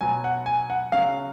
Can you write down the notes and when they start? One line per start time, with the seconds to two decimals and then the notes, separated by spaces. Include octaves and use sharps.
0.01 B2 F#3 G#5
0.24 F#5
0.46 G#5
0.70 F#5
0.92 C#3 F#3 F5